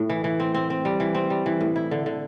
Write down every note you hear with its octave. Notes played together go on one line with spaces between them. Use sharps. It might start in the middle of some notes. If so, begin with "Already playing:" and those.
Already playing: A2
E3
E3
C4
C4
C4
G3
E3
C4
G3
E3
A2
E4
D3
D3